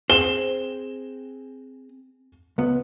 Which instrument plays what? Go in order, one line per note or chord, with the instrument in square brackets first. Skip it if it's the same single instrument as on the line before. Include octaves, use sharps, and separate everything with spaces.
[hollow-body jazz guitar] C4 G#4 C5 [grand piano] E7 G7
[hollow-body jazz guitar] C#2 B3